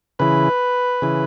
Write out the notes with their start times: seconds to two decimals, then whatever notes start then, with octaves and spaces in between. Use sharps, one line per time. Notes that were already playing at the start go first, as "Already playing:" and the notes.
0.19 C#3 E3 B4
1.02 C#3 E3